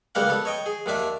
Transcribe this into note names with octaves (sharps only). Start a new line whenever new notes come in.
C#2 G3 A#3 A#4 F#5
B3 A4
C#5 D#5 G5
G#4
D#2 D#3 D4 E5